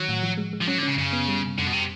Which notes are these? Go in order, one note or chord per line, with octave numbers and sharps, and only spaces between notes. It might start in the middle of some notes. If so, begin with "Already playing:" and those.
Already playing: D#3 F#3
A2
F3
G#3
G#3
F3
F#3 C#4
D3
C#4
C#3
F#2 C#3
B3
G3
C3
F2 D3
B2
C3